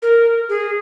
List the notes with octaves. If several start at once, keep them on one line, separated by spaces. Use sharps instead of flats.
A#4
G#4